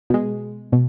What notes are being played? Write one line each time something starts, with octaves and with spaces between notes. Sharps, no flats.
B2 G#3
B2